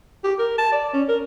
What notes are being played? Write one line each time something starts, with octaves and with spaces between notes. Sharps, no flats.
G4
A#4
A5
D5
C#4
A#4